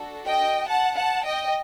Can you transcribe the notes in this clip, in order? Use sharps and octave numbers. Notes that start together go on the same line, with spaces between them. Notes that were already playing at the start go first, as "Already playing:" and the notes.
Already playing: D4 F#4 A4
D#5 G5
F#5 A5
F#5 A5
D#5 G5